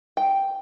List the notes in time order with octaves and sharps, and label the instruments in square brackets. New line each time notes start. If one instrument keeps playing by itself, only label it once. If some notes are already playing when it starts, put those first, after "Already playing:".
[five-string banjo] G5